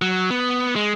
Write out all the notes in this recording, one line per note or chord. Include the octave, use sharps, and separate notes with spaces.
F#3
B3
G#3